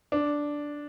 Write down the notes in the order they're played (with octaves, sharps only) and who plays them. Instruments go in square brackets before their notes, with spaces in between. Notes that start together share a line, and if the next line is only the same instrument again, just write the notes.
[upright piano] D4